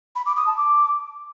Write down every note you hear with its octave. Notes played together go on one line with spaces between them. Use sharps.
B5
D6
D#6
A5
D6